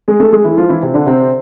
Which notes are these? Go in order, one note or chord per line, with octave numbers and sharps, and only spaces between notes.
G#3 G#4
A3 A4
G#3 G#4
E3 E4
F3 F4
E3 E4
C3 C4
D3 D4
C3 C4